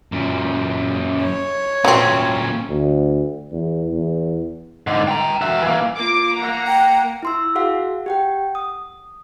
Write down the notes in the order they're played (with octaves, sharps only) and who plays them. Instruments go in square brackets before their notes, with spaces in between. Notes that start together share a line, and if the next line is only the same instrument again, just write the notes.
[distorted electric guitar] F#2 A#2
[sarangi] C#5
[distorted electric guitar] A#2 C#4 [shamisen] F#3 A3 C4
[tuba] D2
E2
E2
[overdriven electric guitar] G#2 D3
G5 A#5
F#4 E5
E3 A#3
[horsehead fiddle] A#3 F4 [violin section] D6
[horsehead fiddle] A#3 F#5 [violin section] A#5
[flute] G5
[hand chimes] E4 C6 E6
F#4 G#4 F5 F#5
G4 F#5 G5
D#6